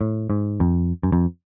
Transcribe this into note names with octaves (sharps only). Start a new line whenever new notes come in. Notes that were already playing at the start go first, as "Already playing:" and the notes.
A2
G#2
F2
F#2
F2